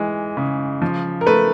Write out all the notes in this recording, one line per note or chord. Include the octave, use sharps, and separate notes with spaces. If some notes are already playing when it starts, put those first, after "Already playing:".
Already playing: E3 G#3
C#3
F3
A#4
A3 B4